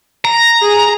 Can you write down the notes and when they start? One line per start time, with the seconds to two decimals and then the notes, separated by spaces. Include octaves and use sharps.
0.25 A#5
0.61 G#4